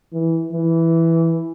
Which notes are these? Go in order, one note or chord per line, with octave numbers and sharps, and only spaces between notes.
E3
E3